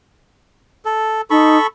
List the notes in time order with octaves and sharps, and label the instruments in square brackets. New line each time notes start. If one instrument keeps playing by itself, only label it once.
[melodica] A4
[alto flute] D#4 [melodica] A4 B5 C#6